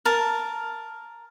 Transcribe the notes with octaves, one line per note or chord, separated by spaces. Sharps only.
A#4 A5